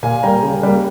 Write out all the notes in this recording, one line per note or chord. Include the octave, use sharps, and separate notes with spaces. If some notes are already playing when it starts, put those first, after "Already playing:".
A#2 F5 G#5
G3 A#3 G5 A#5
C#3
G3 A#3